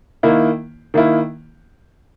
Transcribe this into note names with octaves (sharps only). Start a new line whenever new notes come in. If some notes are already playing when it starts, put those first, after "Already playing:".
D#3 A#3 E4
D#3 A#3 E4